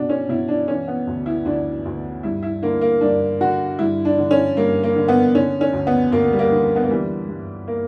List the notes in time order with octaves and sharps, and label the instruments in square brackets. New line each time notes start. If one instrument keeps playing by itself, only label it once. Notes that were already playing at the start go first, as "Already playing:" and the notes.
Already playing: [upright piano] B2 D4
C#4
B2 E4
D4
E3 C#4
B3
D2
E4
D2 D4
D2
G2 E4
E4
D3 A#3
A#3
G2 D4
D3 F#4
G2 E4
D4
D3
C#4
G2 A#3
A#3
D3
B3
D3 C#4
C#4
D2
B3
D2 A#3
G3
A#3
D3
B3
A#3
E3 G3
G2
A#3